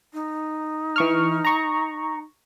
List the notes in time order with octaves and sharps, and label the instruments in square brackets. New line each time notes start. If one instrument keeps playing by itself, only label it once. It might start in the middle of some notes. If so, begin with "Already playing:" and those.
[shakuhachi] D#4
[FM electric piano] E3 C#6 F6
A#5 C#6